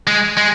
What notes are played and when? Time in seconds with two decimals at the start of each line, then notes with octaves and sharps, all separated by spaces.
0.07 G#3
0.37 G#3